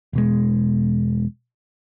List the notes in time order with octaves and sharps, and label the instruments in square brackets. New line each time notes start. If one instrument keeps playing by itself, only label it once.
[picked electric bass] E1 B2 G#3